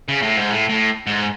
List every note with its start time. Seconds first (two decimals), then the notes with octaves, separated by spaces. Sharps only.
0.09 C#3
0.22 A2
0.37 G#2
0.51 A2
0.69 A2
1.07 G#2